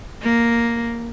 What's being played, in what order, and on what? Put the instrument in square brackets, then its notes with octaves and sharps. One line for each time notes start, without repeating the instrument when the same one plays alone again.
[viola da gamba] A#3